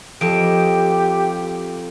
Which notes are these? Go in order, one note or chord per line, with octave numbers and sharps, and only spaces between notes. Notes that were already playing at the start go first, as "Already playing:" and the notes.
F2 G4 A4 D#5 D7